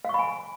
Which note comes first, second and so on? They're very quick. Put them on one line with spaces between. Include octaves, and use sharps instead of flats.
F5 C#6 B5 G#5